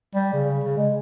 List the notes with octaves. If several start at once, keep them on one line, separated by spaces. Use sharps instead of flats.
G3
C#3
C#3
G#3